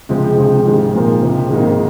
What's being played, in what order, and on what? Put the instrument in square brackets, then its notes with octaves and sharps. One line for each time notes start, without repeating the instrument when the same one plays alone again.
[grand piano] C#2 C3 F3 G#3
C#2 C3 F3 G#3
G#1 G#2 D#3 G#3
A#2 F3 A#3
C#2 C3 F3
G#1 G#2 D#3 A#3 D#4